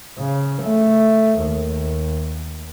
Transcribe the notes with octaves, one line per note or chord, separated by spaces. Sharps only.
C#3
A3
D#2